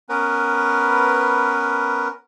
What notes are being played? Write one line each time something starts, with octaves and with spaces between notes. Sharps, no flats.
B3 C#4 A#4 B4